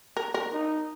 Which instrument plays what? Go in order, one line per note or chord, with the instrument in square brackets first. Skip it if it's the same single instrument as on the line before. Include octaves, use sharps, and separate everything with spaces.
[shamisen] A#4
A#4
[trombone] D#4